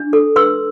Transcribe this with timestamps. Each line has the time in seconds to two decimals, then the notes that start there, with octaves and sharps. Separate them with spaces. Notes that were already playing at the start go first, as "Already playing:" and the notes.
Already playing: D4
0.13 A4
0.36 B4 C6 E6